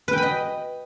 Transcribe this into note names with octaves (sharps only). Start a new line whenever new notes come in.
B4 D#5 G5 B5